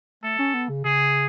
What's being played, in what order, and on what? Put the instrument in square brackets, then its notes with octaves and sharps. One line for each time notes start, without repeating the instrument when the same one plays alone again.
[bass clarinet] A3 [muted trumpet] A4
[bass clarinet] C#4
B3
C#3
[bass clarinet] C#3 [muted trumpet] G#4